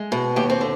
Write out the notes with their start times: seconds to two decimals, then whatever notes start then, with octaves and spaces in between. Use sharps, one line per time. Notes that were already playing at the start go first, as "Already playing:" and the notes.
Already playing: G#3
0.12 B2
0.36 D#2 G4
0.50 C4
0.61 D3